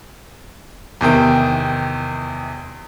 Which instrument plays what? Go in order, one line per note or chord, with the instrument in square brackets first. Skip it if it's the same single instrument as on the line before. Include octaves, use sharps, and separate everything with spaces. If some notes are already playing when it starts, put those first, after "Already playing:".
[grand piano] E2 C3 D#3 G5